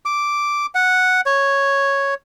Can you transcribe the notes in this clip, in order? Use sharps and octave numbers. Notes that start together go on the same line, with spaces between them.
D6
F#5
C#5